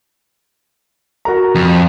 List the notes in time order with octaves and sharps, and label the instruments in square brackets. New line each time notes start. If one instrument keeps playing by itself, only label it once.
[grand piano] F#4 A#4 A#5
[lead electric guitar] F2